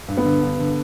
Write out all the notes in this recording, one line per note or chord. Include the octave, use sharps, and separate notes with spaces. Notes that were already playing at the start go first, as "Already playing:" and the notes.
G2
B3
D3
G2
D3